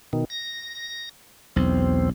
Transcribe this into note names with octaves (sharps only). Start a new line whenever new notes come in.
B2 D#3
A#6
B1 E2 C4